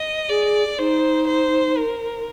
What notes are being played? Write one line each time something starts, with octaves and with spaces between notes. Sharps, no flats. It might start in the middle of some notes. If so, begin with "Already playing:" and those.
Already playing: D#5
G#4 D5
D#4 C5
C5
A#4